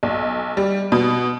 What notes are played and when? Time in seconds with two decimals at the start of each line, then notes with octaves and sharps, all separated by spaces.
0.03 B1
0.57 G3
0.92 B2